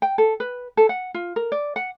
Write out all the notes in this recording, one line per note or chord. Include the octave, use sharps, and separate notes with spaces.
G5
A4
B4
A4
F#5
F4
A#4
D5
F#5